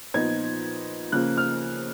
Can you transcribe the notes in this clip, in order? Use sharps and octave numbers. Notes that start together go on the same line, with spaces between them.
A#2 F3 B3 D#4 G#6
C#3 F3 A#3 F#6
F6